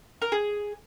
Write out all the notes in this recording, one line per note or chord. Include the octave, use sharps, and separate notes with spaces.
A#4
G#4